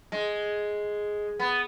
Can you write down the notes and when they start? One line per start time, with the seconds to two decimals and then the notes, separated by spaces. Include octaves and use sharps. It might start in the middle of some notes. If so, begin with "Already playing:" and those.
0.12 G#3
1.40 B3